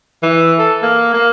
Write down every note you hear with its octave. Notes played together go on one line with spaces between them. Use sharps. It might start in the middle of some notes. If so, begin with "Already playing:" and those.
E3
A4
A#3
A#3